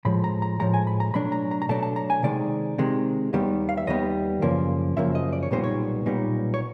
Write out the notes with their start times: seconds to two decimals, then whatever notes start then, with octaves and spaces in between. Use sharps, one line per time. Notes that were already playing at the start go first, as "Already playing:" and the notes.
0.05 A2 F3 G#3 B5
0.24 A#5
0.42 A#5
0.60 A2 F3 G#3 A#5
0.74 G#5
0.87 B5
1.00 A#5
1.14 B2 F#3 A3 D4 B5
1.32 A#5
1.51 A#5
1.62 A#5
1.69 B2 F#3 A3 D4 A5
1.83 A5
1.96 A#5
2.10 G#5
2.23 C3 D#3 G#3 D5
2.78 C3 D#3 G#3
3.33 D#2 D#3 G3 B3
3.69 F5
3.77 E5
3.87 D#2 D#3 G3 B3 D#5
4.42 F#2 C#3 F3 A#3
4.96 F#2 C#3 F3 A#3 E5
5.15 D#5
5.33 D5
5.43 C#5
5.51 B1 A#2 G3 B3 D#4 C5
5.64 C#5
6.06 B1 A#2 G3 B3 D#4
6.54 C#5